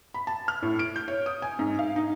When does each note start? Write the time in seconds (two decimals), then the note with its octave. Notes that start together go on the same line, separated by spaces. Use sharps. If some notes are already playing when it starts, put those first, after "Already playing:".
0.14 B5
0.27 A5
0.48 F6
0.62 A2
0.79 D7
0.96 G6
1.08 C#5
1.26 D#6
1.42 G#5
1.59 G#2
1.79 F5
1.96 D#4